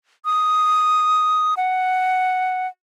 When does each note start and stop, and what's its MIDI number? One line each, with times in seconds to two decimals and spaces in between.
0.25 1.54 87
1.57 2.67 78